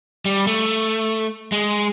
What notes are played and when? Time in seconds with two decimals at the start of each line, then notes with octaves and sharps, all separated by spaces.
0.25 G3
0.47 A3
1.52 G#3